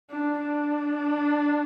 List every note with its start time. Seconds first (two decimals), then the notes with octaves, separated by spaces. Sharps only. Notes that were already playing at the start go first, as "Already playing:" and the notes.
0.10 D4
0.41 D4